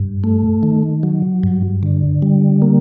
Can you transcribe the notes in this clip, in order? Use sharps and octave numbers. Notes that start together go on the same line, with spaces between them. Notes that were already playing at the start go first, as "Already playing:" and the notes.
Already playing: G2
A3
D#3
F#3
G2
D3
G3
A#3